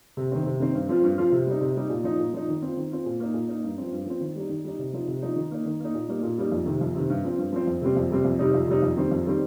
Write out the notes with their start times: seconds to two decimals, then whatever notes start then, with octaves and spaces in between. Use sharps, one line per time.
0.17 C3
0.32 D#3 C4
0.46 C3
0.60 D#3 C4
0.75 G2
0.89 F3 C4 F4
1.04 G2
1.18 F3 C4 F4
1.32 C3
1.47 G3 D#4
1.61 C3
1.76 G3 D#4
1.90 A#2
2.04 F3 D#4
2.19 A#2
2.33 F3 D#4
2.48 D#3
2.62 C4 F4
2.77 D#3
2.91 C4 F4
3.06 A#2
3.20 A#3 D#4
3.34 A#2
3.48 A#3 D#4
3.64 G2
3.78 F3 C4
3.92 G2
4.06 F3 C4
4.21 D#3
4.36 G3 D#4
4.49 D#3
4.64 G3 D#4
4.79 C3
4.93 F3 D#4
5.08 C3
5.22 F3 D#4
5.36 D#3
5.51 A#3 D#4
5.66 D#3
5.80 A#3 D#4
5.95 A#2
6.08 G3 A#3 D#4
6.23 A#2
6.38 G3 A#3 D#4
6.52 F2
6.66 C3 D#3
6.81 F2
6.95 C3 D#3
7.10 G2
7.24 F3 C4
7.38 G2
7.53 F3 C4
7.67 F2
7.81 C3 G3 C4
7.96 F2
8.11 C3 G3 C4
8.25 F2
8.39 C3 G3 D#4
8.54 F2
8.68 C3 G3 D#4
8.82 F2
8.97 D#3 G3 C4
9.11 F2
9.27 D#3 G3 C4